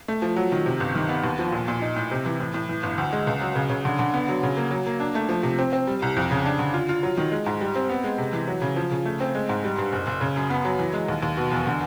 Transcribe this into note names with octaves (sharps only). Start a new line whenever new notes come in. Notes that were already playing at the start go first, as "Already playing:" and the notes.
A3
F3
F#3
D#3
C3
G1
D#3
B3
D#2
F3
A#2
A#2
D#4
A2
C3
E3
A2
A2
E3
G1
D2
G#3
C#2
F#3
C#3
C#3
D3
D3
B3
F#3
C#3
A#3
F#3
A#3
D4
A3
F3
C3
C4
C4
G3
C2
F2
C#3
D4
D3
F4
F4
F#3
D#3
G#3
G#2
G3
C4
B3
G#3
C3
E3
F#3
C#3
F3
C#3
A3
C4
G#3
G#2
G3
G2
F#1
F#1
C#3
F#2
B3
F#3
E3
G#3
D#2
D#2
B2
E2
D3